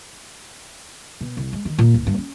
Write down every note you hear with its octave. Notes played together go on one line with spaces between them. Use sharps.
B2
C2
G#3
D#3
A#2
D1
G2
C#4